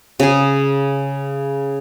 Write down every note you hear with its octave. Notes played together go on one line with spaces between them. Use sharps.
C#3 G#4